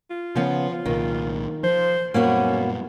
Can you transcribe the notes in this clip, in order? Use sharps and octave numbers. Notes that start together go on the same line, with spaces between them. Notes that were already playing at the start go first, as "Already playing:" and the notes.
F4
C#3 F3 B3
C2 A#2 D#3
F3 C5
F#2 A#2 G3 A#3 B3 C#4 F#4